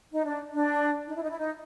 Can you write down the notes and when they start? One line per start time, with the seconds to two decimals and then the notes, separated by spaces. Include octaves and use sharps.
0.13 D#4
0.26 D4
0.52 D4
1.07 D#4
1.15 E4
1.23 D#4
1.30 E4
1.39 D#4